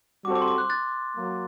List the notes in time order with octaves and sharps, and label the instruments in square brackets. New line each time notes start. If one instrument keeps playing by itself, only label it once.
[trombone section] G3 C4 F#4 A4 C5 [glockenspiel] D6
[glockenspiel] D6
C6
D6
F#6
F#6 A6
[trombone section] F#3 A#3